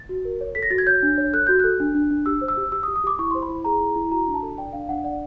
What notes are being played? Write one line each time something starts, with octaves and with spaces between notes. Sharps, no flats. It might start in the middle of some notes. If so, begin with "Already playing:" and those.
Already playing: A6
F#4
A#4
C#5
A4 B6
A#6
F#4 A6
G#6
C#5 G6
D4
C#5
A4 F#6
F#4 G6
A4 F#6
D4
D4
D4
G4 E6
C5
E6
G4
G4 E6
D#6
G4
D#6
G4 D6
E4 C#6
C5 C6
B5
E4
G#4 A#5
E4
E4
F#4 A#5
D4
A5
A4
D5 G5
D4 F5
D4 F#5
D5 F#5